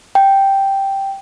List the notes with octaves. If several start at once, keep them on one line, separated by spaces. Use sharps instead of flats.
G5